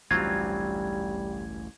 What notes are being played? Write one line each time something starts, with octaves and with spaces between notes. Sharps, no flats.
A1 D2 G2 F#3 G3 C4 F4 G#6